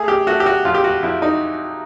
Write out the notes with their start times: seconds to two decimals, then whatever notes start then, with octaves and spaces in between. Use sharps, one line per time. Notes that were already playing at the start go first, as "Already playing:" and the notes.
Already playing: A3 G#4
0.08 G4
0.27 A3 F#4
0.40 G4
0.46 F#4
0.65 F2 F4
0.74 G4
0.84 F#4
1.03 F2 E4
1.22 D#4